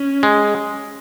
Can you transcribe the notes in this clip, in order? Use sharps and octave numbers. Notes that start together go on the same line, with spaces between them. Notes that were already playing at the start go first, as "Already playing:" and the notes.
Already playing: C#4
G#3